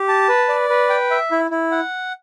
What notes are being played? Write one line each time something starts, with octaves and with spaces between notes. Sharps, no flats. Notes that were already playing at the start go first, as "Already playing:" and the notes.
Already playing: G4
A5
B4
D5
B4
G5
E5
E4
E4
F#5